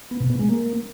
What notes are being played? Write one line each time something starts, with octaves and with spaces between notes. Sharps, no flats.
B3
B2
B3
G#3
A#3